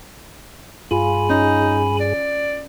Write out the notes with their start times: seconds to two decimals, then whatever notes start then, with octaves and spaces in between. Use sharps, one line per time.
0.91 G2 F4 G#4 G#5 B5
1.30 C#4 D#4
2.00 D5